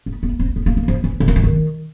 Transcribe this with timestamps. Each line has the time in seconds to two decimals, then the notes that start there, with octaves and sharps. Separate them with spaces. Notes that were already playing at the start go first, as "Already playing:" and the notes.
0.06 B3
0.23 B3
0.39 C4
0.56 B3
0.66 A#3
0.77 A#3
0.88 F3
1.04 E3
1.20 D3
1.28 D#3
1.36 E3
1.44 D#3